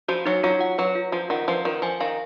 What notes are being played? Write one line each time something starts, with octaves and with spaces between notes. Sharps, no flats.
F3 F#4
F#3 D#4
F#3 F4
F#5
F#3 B4
F4
F3 F4
D#3 F#5
F3 B4
D#3 F4
F3 G#5
D#3 F5